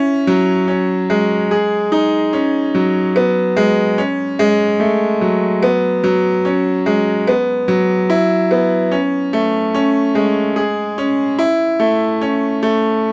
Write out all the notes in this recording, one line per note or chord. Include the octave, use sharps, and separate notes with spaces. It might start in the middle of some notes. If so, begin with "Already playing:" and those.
Already playing: C#4 E4
F#3
C#4
G#3
G#4
D#4
C#4
F#3
B3
G#3
C#4
G#3
A3
F#3
B3
F#3
C#4
G#3
B3
F#3
E4
B3
C#4
A3
C#4
G#3
G#4
C#4
E4
A3
C#4
A3